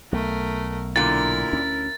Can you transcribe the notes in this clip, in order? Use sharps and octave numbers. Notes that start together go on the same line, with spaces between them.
B1 A3 A#4
A#2 D3 E4 A#4 A6
D2 C#4